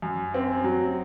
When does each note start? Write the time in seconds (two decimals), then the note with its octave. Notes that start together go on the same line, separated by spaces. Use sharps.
0.02 F#2
0.34 C4
0.64 F#3